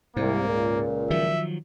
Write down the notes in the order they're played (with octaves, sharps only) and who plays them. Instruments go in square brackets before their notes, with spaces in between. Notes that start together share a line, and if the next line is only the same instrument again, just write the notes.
[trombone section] C2 [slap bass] G#2 [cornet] A#3 [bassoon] C4
[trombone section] C#2 [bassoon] A#2
[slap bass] D#3 F3 F#3 [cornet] E5